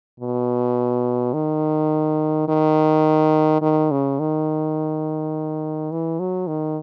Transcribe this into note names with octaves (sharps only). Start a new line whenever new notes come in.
B2
D#3
D#3
D#3
C#3
D#3
E3
F#3
D#3